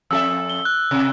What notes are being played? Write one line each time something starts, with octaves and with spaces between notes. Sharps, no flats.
F2 A4 E5 E6
G7
F#6
C3